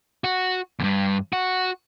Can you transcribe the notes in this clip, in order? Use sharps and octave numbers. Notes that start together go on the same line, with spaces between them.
F#4
E2 G2
F#4